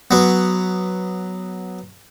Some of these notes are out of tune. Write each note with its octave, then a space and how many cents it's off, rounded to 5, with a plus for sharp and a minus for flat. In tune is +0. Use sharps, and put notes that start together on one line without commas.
F#3 +0 B3 +0